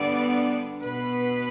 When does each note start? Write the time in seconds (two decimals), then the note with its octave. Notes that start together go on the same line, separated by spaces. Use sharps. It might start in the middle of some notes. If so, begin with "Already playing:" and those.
Already playing: D3 G3 B3 D5
0.81 B2 B4
0.87 B3